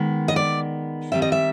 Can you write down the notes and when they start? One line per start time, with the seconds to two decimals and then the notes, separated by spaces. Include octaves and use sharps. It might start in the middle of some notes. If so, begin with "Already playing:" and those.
Already playing: D#3 G#3 B3
0.28 D#5
0.36 D5
1.12 D#3 G3 C4 E5
1.22 D#5
1.32 E5